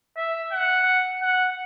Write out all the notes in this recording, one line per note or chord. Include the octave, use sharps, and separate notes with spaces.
E5
F#5
F#5